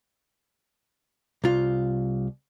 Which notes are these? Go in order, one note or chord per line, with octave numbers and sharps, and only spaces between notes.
C2 F4